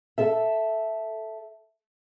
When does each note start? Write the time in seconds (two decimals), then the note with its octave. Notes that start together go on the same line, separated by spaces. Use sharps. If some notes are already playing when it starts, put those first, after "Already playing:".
0.18 A4 E5